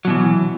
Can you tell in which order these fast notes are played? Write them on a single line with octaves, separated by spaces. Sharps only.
F#3 B2 E3